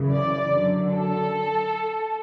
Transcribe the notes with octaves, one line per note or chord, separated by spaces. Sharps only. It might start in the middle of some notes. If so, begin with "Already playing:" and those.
Already playing: F#2 C#3 E3
D5
F#2 D3 F#3
A4